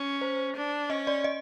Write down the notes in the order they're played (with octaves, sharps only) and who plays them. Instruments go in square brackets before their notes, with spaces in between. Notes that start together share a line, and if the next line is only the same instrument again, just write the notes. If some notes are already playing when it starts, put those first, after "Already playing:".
Already playing: [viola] C#4
[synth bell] C5
[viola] D4
[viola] C#4 [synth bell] D#5
[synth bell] D5
D#5